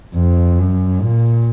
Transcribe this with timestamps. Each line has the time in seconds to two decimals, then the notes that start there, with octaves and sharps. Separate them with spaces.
0.14 F2
0.58 F#2
1.02 A#2